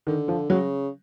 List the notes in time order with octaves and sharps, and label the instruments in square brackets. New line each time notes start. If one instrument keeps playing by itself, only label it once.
[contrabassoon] D3 [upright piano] D#3
[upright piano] F3
[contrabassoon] C#3 [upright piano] F#3